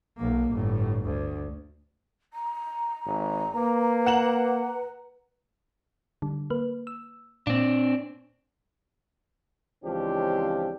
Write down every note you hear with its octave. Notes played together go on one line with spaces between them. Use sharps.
B1 A#3
G1 A2
D2
A#5
G#1
A#3 B4
F#5 E7 F#7
D3 G3
A#3 B4
E6
A#2 C4 D4
C#2 E3 F3 C4 D4 G4